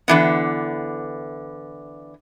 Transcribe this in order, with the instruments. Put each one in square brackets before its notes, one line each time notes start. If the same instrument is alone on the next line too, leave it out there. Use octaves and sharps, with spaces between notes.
[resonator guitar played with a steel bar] D3 E3 B3